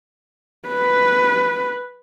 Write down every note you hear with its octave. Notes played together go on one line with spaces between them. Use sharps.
B4